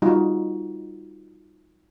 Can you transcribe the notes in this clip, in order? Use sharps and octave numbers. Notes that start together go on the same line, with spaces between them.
G3 D#4 F4 F#4